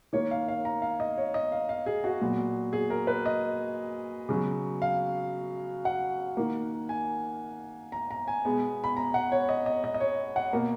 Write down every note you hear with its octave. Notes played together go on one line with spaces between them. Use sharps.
D#3 A#3 C#5
F5
F5
A#5
F5
D#5
C#5
D#5
F5
F5
G#4
F#4
A#2 F#3 B3
G#4
A#4
B4
D#5
C#3 F#3 B3
F5
F#5
D#3 A#3
G#5
A#5
A#5
G#5
B2 G#3 B3
B5
A#5
F#5
C#5
D#5
D#5
D#5
D#5
C#5
F#5
B2 A#3